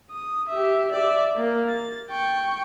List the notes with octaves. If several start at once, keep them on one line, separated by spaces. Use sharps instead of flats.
D#6
G4 E5
D5 E5
A#3
A6
G5 C#6